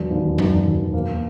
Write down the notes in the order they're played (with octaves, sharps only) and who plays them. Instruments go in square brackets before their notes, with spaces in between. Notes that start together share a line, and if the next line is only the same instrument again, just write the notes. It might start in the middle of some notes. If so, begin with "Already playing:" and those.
Already playing: [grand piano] E1 F#3
D#2
[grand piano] E1 [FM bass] F#2
[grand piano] E1
A#3